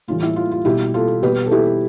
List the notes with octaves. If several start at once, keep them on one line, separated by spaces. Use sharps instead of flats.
A2 E3 G3 F4
E4
F4
F4
B2 G3 E4 G4
F4 A4
B2 G3 G4 B4
A4
E4 G4